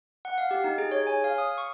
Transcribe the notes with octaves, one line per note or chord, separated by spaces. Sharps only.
F#5
F5
G4
D#4
G#4
C#5
G#5
F5
D#6
C#6